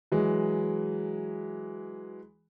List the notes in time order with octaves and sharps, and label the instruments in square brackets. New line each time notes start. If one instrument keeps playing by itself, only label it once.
[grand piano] E3 F#3 G#3